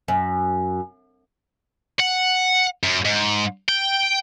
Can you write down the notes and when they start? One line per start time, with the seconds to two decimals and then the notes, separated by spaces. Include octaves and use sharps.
0.08 F#2
2.00 F#5
2.83 F#2
3.05 G#2
3.69 G5